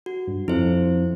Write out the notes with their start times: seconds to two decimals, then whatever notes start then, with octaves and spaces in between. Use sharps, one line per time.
0.06 F#4
0.28 G2
0.48 F2 E4 C5